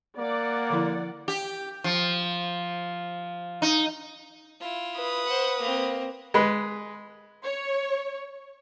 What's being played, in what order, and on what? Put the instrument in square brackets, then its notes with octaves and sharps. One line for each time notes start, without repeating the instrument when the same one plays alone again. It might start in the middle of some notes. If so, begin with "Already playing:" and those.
[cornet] A#3 [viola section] D5 F#5
[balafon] D3 F3 E4
[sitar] G4
F3
D#4
[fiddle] E4 F4
[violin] B4 D#6
[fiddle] C5 F#5
A#3 C4
[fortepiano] G#3 B4
[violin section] C#5